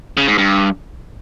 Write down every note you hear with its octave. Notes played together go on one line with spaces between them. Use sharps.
C#3
G#2
G2